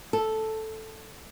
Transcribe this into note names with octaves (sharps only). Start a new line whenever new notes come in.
A4